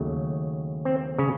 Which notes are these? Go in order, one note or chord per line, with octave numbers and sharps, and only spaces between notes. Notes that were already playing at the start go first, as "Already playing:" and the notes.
Already playing: D#2 C#3 F#3 A3
C4
C#3 C#4